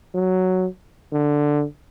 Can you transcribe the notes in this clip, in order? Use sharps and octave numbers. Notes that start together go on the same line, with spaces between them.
F#3
D3